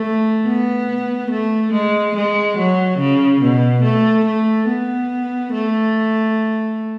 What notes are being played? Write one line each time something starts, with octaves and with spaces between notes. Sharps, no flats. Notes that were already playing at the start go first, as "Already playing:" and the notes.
Already playing: A3
B3
A3
G#3
G#3
F#3
C#3
B2
A3
A3
B3
A3